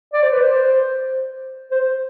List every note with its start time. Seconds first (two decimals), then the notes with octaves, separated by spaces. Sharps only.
0.13 D5
0.23 C5
0.32 B4
0.42 C5
1.71 C5